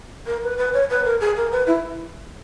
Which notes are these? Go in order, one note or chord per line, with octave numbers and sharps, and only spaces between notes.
A#4
B4
B4
C#5
B4
A#4
G#4
A#4
B4
E4